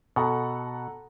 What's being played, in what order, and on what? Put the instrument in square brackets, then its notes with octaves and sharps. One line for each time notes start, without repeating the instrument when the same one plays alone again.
[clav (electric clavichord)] B2 [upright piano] A4 F#5 A#5